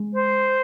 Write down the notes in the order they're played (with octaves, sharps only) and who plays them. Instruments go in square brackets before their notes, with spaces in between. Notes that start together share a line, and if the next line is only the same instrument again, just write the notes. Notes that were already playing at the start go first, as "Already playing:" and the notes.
Already playing: [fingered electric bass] G#3
[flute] C5